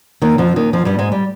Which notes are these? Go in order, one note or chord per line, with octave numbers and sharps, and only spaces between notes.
D#2 D#3
F2 F3
D#2 D#3
F2 F3
G2 G3
G#2 G#3
G3